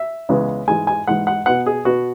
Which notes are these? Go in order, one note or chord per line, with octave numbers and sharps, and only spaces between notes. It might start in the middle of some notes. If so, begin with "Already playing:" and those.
Already playing: E5
C#2 C#3 E3 G#3 B3
G#2 E3 G#3 G#5
G#5
G#2 E3 G#3 F#5
F#5
B2 B3 F#5
G#4
B2 B3 F#4